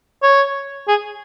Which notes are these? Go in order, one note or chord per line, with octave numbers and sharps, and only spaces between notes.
C#5
G#4